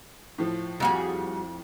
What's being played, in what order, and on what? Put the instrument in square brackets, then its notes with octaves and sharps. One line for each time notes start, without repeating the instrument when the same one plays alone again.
[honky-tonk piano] A2 F3
[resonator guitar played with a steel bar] F2 [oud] G3 F#4 G#4